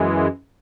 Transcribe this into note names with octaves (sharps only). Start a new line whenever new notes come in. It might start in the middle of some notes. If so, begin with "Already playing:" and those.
Already playing: F#2 E3 G#3